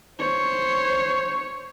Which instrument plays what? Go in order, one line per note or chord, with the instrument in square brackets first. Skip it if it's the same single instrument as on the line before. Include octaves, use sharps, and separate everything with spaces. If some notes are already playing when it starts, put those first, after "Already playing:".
[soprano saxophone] C5 [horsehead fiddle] C#5